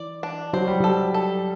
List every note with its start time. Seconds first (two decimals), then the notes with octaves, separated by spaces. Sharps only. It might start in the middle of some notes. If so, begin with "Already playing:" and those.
Already playing: E3 D5
0.23 D4
0.53 F#3 C5
0.67 G3
0.80 F#3 A4
1.14 A4